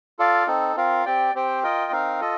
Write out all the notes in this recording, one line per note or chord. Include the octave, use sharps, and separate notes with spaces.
F4 A4 D5 F5
C4 D#4 A4
C4 F4 A#4 F5
C4 G4 D5 G5
C4 G4 C5 G5
F4 A#4 D#5 G5
C4 D#4 A#4 F5
F4 A4 D#5